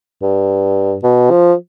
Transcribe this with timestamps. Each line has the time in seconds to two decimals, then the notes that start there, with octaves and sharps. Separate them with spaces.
0.22 G2
1.03 B2
1.30 F3